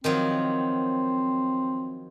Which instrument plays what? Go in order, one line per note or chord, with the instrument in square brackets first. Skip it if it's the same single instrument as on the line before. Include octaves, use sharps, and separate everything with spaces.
[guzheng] D#3 F3 F#3 [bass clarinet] C4